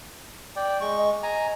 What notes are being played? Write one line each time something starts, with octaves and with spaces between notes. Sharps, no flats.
D5 G5
G#3 C#6
D#5
G#5 A#5